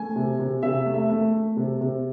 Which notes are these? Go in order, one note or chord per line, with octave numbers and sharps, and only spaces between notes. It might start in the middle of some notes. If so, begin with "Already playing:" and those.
Already playing: A3 G#5
C3
C3
C3 E5
A3
E5
A3
A3
C3
C3